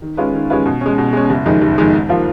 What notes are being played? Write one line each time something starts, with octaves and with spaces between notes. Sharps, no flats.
D#3
G#3 C#4 F4 B4
D#3
G#3 C#4 F4 B4
B2
G#3 C#4
B2
G#3 C#4
F#1
F2 D#3 G#3 D#4
F#1
F2 D#3 G#3 D#4
G#2
F3 A#3 F4